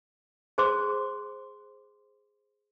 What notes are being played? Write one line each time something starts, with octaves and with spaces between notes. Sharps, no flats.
G#4 C5 C6 D6